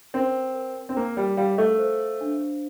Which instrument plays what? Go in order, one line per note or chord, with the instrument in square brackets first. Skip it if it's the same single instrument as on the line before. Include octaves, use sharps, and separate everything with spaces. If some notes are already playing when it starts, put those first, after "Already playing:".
[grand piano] C4 [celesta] A#4
[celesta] A#4
[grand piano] C4
[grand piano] A#3 [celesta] A#4
[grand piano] G3
[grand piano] G3 [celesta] F5
[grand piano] A3
[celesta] C5
D4